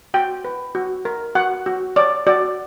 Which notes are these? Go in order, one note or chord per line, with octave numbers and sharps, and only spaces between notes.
F#4 G5
B4
F#4
A#4
F#4 F#5
F#4
C#5 D5
F#4 D5